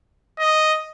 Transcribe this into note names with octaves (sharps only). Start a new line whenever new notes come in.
D#5